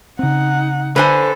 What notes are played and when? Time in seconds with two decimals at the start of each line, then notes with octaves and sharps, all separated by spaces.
0.19 C#3 C4 D#4 F#5
0.96 D3 A4 B4 C5 G#5